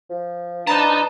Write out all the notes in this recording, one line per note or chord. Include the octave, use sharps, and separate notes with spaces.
F3
D4 B4 D#5 A5 A#5